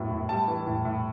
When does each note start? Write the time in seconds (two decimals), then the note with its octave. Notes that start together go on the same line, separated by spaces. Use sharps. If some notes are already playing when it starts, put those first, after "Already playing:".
Already playing: F#2 A2 F#3 B3
0.11 A2
0.29 G3 A5
0.48 E3
0.66 A2
0.85 A2